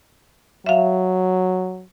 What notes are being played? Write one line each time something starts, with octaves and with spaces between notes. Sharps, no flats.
F#3 E5 F5